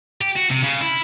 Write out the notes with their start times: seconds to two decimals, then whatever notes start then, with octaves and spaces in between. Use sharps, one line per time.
0.21 G4
0.36 F#4
0.50 C3
0.63 C#3
0.81 E4